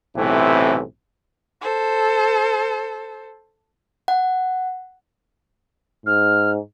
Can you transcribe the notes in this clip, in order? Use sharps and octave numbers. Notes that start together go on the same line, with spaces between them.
B1 A2 C3 E3 C4
A4 C5
F#5
G#2 F6